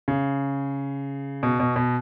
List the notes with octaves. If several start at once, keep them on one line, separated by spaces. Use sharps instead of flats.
C#3
B2
B2
B2